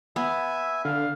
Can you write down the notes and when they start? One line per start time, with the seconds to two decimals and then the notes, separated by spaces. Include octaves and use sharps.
0.16 B3 E5 G#5
0.85 D3 F5